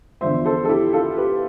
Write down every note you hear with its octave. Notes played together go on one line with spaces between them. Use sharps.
E2 D3 F3 C5 E5
A4 C5
A4
E4 G4
F4 A4
G4 B4